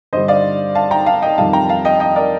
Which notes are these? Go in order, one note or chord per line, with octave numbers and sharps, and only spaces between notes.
G2 D3 G3 C5 D#5
D5 F5
F5 A5
G5 A#5
F5 A5
D#5 G5
F2 D#3 G3 F5 A5
G5 A#5
F5 A5
D#5 G5
D#5 G5
A#4 D5